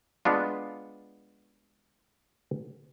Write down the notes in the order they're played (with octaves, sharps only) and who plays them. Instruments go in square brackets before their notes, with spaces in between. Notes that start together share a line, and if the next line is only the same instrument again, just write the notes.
[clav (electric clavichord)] G#3 B3 D4 F4